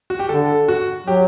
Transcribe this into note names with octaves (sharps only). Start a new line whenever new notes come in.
F#4
G4
D3 A4
F#4
F#3 G4